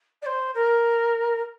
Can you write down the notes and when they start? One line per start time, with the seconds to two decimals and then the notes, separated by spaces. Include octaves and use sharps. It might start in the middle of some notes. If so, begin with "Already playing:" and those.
0.22 D5
0.26 C5
0.54 A#4